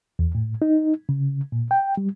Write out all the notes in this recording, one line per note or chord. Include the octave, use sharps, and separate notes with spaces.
E2
A2
D#4
C#3
A#2
G5
G3